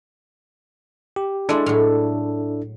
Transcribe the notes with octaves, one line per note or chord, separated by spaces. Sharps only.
G4
G#3 D4 E4 A4 D5
A2 F#3